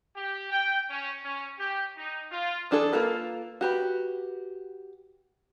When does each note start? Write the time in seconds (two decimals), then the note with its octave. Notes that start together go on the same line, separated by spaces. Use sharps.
0.16 G4
0.51 G5
0.90 C#4
1.24 C#4
1.59 G4
1.97 D#4
2.31 F4
2.71 E3 D4 G#4 A4
2.93 A#3 F4 A4 B4
3.61 F#4 G4 B4